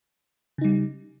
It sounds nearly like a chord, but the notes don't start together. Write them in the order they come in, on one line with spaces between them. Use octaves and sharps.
C#3 D#4 G3